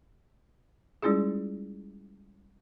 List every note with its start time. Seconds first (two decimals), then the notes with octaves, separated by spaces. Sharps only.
1.02 G3 G#3 C#4 E4 F4 G#4